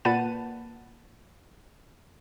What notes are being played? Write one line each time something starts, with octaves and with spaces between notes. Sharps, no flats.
A#2 B4 F#5 A5 D#7